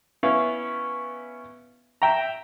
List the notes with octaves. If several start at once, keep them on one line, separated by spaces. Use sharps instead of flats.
B3 C#4 E4 F5
E5 G5 A#5